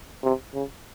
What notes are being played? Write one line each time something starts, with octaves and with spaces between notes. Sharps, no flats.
C3
C#3